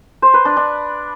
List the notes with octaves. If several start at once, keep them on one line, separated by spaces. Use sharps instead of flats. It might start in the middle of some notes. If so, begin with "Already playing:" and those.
C5
B4
D4
D4